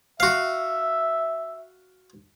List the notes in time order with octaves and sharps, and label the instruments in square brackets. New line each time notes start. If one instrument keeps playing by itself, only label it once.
[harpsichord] F#4 F5 [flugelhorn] E5